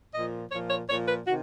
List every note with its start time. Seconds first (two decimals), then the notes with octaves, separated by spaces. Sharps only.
0.14 A#2 F3 D#5
0.52 A#2 F3 C#5
0.70 C#5
0.89 A#2 C#5
0.93 F3
1.08 B4
1.27 C3 D#3 F#4